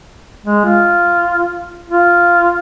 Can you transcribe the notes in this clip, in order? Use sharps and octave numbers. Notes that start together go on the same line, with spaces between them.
G#3
F4
F4